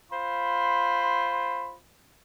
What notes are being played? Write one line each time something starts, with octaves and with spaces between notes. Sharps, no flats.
F4 C5 B5 C6